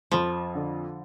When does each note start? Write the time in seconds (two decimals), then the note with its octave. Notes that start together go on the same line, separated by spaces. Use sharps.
0.11 F2 F3
0.55 D3